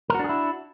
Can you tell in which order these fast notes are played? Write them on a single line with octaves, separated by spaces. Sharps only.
A#4 F#4 D4 G#4 E4